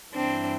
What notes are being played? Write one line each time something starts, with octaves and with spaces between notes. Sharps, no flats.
G2 E3 C4 D4